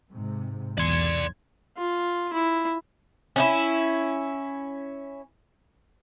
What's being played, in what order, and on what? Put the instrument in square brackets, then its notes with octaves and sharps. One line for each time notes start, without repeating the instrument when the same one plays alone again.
[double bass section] G#2 C3
[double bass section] B1 [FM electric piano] E2 G#6 [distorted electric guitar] D5 C6
[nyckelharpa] F4
E4
[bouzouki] C#4 D#4 E4